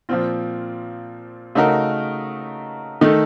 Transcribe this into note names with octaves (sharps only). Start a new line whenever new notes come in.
A#2 F3 C4 F4
C#3 A3 D#4 F#4 A#4
D#3 A3 D#4 A4